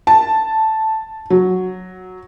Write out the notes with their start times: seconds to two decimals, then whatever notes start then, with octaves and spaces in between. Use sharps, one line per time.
0.07 A5
1.30 F#3